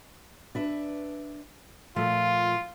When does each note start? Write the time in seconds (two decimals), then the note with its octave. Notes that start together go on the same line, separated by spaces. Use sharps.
0.55 D4 B4 E5
1.96 A#2 F3 A3 F4